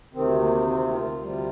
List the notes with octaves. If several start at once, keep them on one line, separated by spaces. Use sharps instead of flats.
D2 C3 D#3 C4
A#3
C4
F4
D2 C3 G3